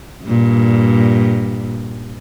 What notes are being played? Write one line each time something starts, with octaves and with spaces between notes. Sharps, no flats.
G2 A#2